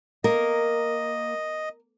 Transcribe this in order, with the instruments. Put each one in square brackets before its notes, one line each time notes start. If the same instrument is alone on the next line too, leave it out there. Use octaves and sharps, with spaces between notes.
[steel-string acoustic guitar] A#3 [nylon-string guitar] A#4 [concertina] D#5